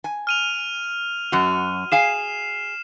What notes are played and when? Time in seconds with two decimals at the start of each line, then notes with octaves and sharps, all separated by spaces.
0.04 G#5
0.27 F6 D#7 F7
1.32 F#2 F#4
1.92 G#4 F5 G#5 C7 E7